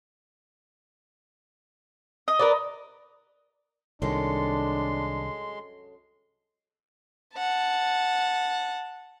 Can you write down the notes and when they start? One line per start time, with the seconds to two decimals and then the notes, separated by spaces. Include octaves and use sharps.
2.28 D#5
2.39 A#4 B4 D5
4.02 C2 F#2 D#3 G#3 D4 A4 C#5 C6
7.37 F#5 A5